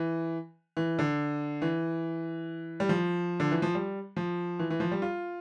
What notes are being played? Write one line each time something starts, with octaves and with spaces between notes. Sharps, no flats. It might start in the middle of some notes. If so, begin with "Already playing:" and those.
Already playing: E3
E3
D3
E3
G3
F3
D3
E3
F3
G3
F3
E3
E3
F3
G3
F4